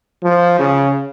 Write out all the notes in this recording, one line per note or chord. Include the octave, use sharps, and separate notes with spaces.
F3
C#3